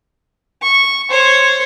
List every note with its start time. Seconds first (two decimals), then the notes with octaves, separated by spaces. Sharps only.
0.62 C#6
1.11 C5 C#5